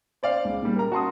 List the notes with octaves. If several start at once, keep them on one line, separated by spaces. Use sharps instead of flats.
C5 D5 F5
C#2
A#2 G3
A#4 A#5
F#4 A5 C6 D#6